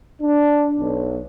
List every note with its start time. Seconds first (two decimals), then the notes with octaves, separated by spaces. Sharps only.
0.22 D4
0.78 B1